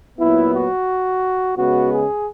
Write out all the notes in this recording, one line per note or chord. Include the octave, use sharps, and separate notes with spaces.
A#2 F#3 B3 E4
F#4
C#3 G#3 B3 F#4
G#4